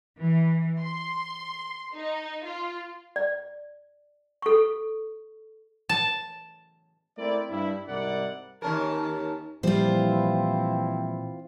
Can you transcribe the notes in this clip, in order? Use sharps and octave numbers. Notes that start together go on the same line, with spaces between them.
E3
C6
D#4
F4
D5
A4 C#6
A5
A3 C4 E4 A#4 D5
G2 E4
C2 G#2 E4 A#4 D5 F#5
D#2 C#4 A#4 A5
A#2 E3 F3 G3 C4 E4 F4 C5